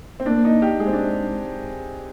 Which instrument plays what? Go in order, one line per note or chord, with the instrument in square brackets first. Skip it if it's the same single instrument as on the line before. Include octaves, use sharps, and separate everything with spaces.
[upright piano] C4
[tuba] A#3 [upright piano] D4
[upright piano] D#4
G4
[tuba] G#3 [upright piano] G#4
[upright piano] C4
D4